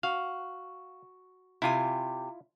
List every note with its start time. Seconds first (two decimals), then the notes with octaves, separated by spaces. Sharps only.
0.03 F#4 F5
1.62 C3 E4 F4 G4 G#5